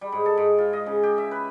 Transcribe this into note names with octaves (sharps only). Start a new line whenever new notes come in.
G3
G#2
A4
G#2
F4
D#5
C#3
G4
E5
B4